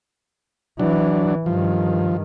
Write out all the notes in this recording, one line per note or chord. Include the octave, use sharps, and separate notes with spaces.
E3 F#3 D4
G2 D#3 F3